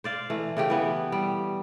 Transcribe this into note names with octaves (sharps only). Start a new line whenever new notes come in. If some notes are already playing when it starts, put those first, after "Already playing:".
C5 D5 F5
E3 A3
C#3 A3 G4
E3 B3
G3